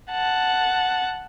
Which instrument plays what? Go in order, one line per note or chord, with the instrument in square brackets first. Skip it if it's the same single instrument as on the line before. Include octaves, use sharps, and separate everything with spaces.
[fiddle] F#5 A5